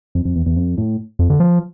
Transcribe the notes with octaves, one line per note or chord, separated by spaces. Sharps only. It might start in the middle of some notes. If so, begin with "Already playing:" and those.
F2
F2
E2
E2
F2
A2
F2
D3
F3